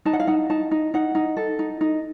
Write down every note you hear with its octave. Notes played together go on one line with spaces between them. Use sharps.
D#4 A5
F#5
F5
D#4 F#5
D#4 A5
D#4
D#4 F#5
D#4
A4
D#4
D#4